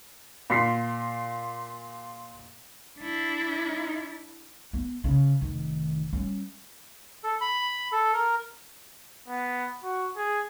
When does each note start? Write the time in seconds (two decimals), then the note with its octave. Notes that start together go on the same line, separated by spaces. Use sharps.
0.50 A#2 C6 B6 C7
3.00 D4 E4
4.73 B3
5.04 C#3
5.41 F1 D#3
6.13 G3 C#4
7.24 A4
7.41 B5
7.92 A4
8.13 A#4
9.28 B3
9.83 F#4
10.16 G#4